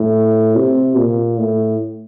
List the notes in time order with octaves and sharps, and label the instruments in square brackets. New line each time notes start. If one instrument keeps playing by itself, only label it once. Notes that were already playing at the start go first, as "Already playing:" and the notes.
Already playing: [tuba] A2
C3
A#2
A2